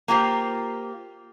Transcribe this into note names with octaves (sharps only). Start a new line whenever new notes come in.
A#3 F4 G4 C5